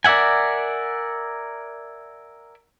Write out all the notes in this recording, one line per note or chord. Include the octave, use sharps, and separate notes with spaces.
A#4 D5 E5 F#5 G#5